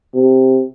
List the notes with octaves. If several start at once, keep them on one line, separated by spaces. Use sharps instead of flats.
C3